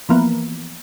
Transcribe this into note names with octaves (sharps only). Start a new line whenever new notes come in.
E3 F3 A#3 B3